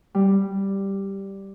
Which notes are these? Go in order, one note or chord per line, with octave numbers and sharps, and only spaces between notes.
G3